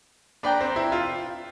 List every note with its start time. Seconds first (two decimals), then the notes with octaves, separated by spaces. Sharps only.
0.43 D4 B4 D5 G5 A#5
0.60 C4
0.76 E4
0.92 F4